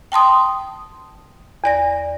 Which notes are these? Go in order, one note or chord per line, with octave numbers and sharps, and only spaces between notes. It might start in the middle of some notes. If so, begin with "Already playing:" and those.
G5 A5 C6 D#6
E2 D5 A#6